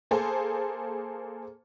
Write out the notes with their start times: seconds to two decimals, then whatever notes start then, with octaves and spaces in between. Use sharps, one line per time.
0.11 A#3 G#4 A4 C5 A5